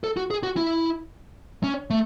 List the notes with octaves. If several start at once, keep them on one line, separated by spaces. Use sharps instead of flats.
A4
F#4
G#4
F#4
E4
C#4
A3